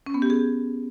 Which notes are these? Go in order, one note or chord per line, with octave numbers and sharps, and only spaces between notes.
C#4
B3
G4
G#4